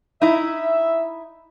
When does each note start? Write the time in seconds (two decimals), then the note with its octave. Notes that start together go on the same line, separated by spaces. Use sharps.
0.22 D#4 E4 E5